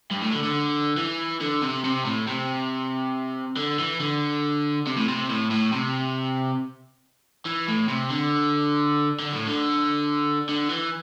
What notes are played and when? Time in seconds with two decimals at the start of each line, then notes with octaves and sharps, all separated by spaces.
0.11 G2
0.22 A2
0.33 D3
0.43 D3
0.97 E3
1.41 D3
1.62 C3
1.85 C3
2.05 A2
2.27 C3
3.57 D3
3.79 E3
4.00 D3
4.87 C3
4.97 A2
5.08 C3
5.30 A2
5.51 A2
5.72 C3
7.46 E3
7.68 A2
7.89 C3
8.10 D3
9.19 D3
9.33 A2
9.47 D3
10.49 D3
10.70 E3